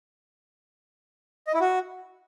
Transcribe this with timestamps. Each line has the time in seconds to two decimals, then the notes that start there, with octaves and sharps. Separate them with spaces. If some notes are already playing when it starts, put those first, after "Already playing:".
1.47 D#5
1.54 E4
1.60 F#4